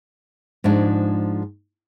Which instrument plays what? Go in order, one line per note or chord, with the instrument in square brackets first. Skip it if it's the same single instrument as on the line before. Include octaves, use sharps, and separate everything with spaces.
[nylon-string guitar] G#2 F3 G#3 D4